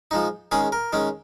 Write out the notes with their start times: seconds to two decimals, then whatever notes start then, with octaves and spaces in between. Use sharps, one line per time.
0.11 F3 G#3 D#4
0.52 D#3 G#3 C#4 G#4
0.72 A#4
0.93 D#3 G#3 C#4